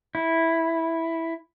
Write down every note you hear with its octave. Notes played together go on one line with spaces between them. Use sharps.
E4